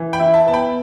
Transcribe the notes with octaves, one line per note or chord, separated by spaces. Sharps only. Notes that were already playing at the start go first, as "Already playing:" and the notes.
Already playing: E3
G5 B5
E4
E5 A5
B3 A5
G5 B5